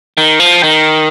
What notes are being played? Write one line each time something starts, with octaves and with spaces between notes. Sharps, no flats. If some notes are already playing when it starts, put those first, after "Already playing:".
D#3
F3
D#3